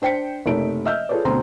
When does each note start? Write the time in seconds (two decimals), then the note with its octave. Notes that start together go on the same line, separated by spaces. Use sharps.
0.02 D4 C5 G5 B6 C#7
0.46 F#1 C3 A3 D#4 D7
0.85 D#5 E5 E6 F6 G6
1.09 F4 G#4 A4 B4 C#5 D5
1.25 D2 B2 C4 C5 A#5 C6